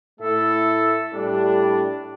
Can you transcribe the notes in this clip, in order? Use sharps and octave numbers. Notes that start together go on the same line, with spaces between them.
A2 A3 E4 A4 E5
A2 G3 D4 G4